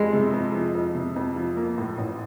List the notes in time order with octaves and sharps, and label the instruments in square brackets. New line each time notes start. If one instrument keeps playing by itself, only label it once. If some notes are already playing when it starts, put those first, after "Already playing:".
Already playing: [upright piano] F2 [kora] G#3
[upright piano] C3
F2
F3
F2
C3
F2
F3
A#3
A2
A1